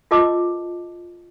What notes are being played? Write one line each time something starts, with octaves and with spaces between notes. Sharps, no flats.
F4 A4 A#4 D#5 A5 D6